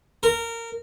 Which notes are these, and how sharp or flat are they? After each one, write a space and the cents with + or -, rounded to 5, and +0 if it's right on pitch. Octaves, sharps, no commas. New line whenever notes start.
A#4 -20